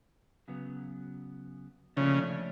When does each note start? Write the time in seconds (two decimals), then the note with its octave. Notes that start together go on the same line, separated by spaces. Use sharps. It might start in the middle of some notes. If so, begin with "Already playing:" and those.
0.48 C#3 F#3 B3
1.97 A#2 C#3 F3 A3 D4